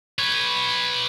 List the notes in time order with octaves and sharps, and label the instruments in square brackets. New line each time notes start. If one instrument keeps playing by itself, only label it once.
[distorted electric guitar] B4 C#5